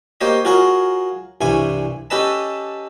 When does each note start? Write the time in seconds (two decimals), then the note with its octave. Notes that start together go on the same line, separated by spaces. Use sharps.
0.21 A#3 G4 C5 C#5 D#5
0.45 F4 F#4 G#4 A#4 C#5
1.41 C2 G2 E3 G#5 C#6
2.10 C#4 G4 A4 B4 D#5 A5